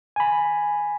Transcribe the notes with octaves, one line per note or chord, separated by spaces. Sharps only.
G#5 B5